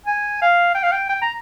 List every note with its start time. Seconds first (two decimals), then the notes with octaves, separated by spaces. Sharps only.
0.06 G#5
0.41 F5
0.75 G5
0.83 F5
0.92 G5
1.09 G5
1.21 A#5